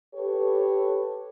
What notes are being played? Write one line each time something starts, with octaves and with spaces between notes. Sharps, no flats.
G4 A4 B4 C#5